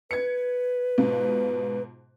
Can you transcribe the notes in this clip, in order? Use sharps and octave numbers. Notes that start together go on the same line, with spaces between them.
B4 G#6 C#7
G#2 B2 F4